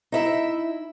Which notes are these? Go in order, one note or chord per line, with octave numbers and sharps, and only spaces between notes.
D#4 E4 E5